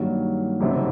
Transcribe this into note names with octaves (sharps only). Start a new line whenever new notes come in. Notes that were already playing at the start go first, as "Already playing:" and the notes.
Already playing: G2 D#3 F#3 A#3
F#1 F2 C3 D#3 F#3